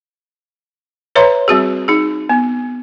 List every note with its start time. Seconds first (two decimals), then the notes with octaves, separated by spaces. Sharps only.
1.15 B4 C#5 E5 A#5 C6
1.48 G3 C4 F#4 G#4
1.88 D#4 G#4
2.29 B3